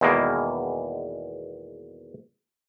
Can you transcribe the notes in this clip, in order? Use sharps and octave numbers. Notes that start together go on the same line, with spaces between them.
E2 B2 D#3 G#3 A#3